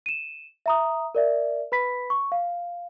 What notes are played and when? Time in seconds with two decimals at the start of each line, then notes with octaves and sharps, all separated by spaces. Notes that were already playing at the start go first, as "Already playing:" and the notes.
0.06 D#7 E7
0.66 E5 A#5 D#6
1.15 A#4 D5 E5
1.72 B4 B5 B6
2.10 C#6
2.32 F5